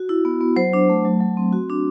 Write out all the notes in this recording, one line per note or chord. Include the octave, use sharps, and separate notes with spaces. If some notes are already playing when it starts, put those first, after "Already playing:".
Already playing: F#4
E4
B3
B3
F#3 C5
D4
A3
F#3
F#3
C4
F#4
D4